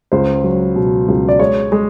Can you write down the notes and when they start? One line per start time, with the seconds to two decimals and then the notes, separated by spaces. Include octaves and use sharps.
0.12 C#2 C5
0.44 F#3
0.76 B2
1.08 C#2
1.29 D5
1.39 G#3 C#5
1.72 G#3